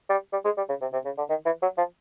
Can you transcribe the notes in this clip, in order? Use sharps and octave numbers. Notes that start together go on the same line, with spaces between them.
G3
G3
G#3
G3
C#3
C3
C3
C#3
D3
D#3
E3
F#3
F3